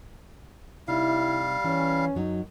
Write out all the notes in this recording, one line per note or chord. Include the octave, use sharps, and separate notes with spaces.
C3 G3 D#4 E4 F5
E3 C#4
F#2 F#3 D#4